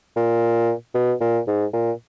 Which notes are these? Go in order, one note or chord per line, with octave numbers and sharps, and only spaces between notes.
A#2
B2
A#2
G#2
A#2